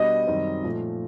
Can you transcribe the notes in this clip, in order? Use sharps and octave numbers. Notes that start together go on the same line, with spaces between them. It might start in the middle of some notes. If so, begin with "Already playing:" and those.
Already playing: B2 G3 B3 D4 G4 D#5
F#2 D#3 G3 C4
A#2 F3 A3